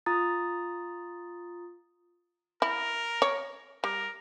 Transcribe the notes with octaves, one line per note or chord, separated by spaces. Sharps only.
F4 A#5 D#6 A6
E4 A#4
C#5
G3 A#4